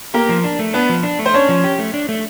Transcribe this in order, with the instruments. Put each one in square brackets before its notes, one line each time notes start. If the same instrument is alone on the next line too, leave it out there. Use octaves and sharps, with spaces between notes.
[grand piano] A#3 A#4 [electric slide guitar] G4
[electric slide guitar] F3
D4
A3
[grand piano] B3 B4 [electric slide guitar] D4
[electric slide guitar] F3
D4
A3
[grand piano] C5
[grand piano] C#4 C#5 [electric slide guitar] D4
[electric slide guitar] F3
G4
A3
D4
A3